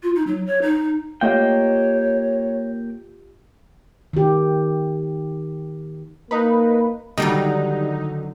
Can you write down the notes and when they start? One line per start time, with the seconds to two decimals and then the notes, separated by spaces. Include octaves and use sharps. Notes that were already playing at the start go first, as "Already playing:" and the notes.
0.03 F4
0.15 D#4
0.27 F#3
0.46 C#5
0.62 D#4
1.21 A3 A#3 F4 G4 C#5 D#5 F5 G5
4.13 D#3 G4
6.31 A#3 D#4 B4
7.18 D3 D#3 F#3 G3 D#4